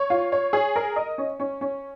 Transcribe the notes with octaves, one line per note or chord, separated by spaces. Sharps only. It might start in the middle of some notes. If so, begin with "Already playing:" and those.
Already playing: C#5
F4
C#5
G#4
A#4
D#5
C#4
C#4
C#4